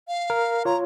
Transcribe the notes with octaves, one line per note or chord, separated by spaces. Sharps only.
F5
A#4
F4 C#5 A#5